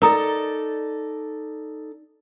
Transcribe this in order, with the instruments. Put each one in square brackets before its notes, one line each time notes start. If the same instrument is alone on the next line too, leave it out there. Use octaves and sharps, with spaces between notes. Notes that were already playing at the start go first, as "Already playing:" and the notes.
[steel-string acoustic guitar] D#4 A4 D5 [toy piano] A#4 A#5 D#6